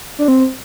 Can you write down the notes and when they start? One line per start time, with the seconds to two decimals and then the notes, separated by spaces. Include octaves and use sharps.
0.19 D4
0.28 C4